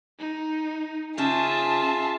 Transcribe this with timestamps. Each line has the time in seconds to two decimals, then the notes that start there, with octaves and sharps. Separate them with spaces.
0.19 D#4
1.18 C#3 C#4 D#4 F4 G#4 E5 A5